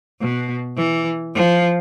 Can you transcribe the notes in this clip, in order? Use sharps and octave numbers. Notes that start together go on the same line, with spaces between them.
B2
E3
F3